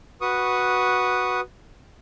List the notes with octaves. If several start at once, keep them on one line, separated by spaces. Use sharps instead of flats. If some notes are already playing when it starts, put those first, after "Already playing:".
F#4 B4 C#6 D#6